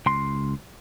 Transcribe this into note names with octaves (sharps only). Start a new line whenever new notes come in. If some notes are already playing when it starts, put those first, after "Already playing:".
C#2 C6